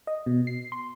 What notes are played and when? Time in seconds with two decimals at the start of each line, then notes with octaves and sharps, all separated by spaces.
0.07 D#5
0.26 B2
0.47 C7
0.72 C6